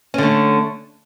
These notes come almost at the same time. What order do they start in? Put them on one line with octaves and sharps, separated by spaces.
C#4 D3 A3